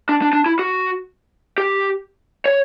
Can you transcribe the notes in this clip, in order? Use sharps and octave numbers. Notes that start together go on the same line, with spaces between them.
D4
D4
D4
E4
F#4
G4
C#5